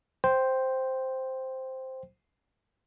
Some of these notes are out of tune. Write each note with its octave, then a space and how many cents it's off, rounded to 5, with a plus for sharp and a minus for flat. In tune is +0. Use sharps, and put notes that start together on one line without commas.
C5 +0 G5 -5